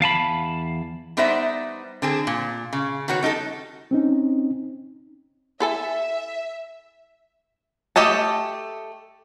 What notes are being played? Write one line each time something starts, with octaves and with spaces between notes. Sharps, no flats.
E2 F5 A5 B5
G3 B3 D#4 C5 D5 E5
D3 C4 G#4
A#2
C#3
D#3 B3 F#4 C#5
G3 D#4 G4 A4
C4 C#4 D#4
E4 A4 E5 G#5
A3 G4 A4 D#5 A5